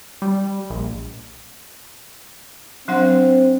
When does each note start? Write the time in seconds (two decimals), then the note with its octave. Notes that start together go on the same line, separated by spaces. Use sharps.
0.22 G3
0.70 A#1
2.88 F#3 C4 D4 F#5